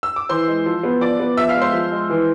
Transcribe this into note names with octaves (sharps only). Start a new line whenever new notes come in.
E6
D6
E3 C5 C6
G#3
F3
B3
F3 D5 D6
B3
F3 E5 E6
F5 F6
G#3
C5 C6
F3
G#3
E3